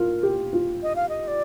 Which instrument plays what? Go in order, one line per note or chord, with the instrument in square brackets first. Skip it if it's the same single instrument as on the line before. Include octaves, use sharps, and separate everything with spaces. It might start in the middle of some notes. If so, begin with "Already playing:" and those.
Already playing: [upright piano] F4 [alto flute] A#4
[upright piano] G4
F4
[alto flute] D#5
F5
D#5
D5